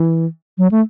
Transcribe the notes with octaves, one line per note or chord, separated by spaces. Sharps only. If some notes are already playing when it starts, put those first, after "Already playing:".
Already playing: E3
F#3
A3